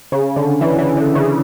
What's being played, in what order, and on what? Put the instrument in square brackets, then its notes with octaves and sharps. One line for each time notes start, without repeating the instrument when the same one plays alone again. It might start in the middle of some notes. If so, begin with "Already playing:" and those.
[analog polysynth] C#3
D3
E3
E3
D3
C#3